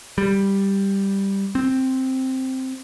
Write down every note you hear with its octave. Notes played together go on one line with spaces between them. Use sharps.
G3
C4